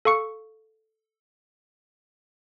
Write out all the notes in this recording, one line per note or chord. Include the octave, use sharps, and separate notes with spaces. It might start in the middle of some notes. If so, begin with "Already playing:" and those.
A4 F5 C#6 C#7